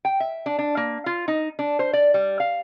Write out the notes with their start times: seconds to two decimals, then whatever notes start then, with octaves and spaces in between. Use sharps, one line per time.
0.05 G5
0.20 E5
0.46 D4
0.59 D4
0.77 A#3
1.06 F4
1.28 D#4
1.59 D4
1.79 C5
1.93 D5
2.14 G3
2.40 F5